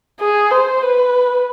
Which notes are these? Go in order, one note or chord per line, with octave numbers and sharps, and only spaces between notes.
G#4
C5
B4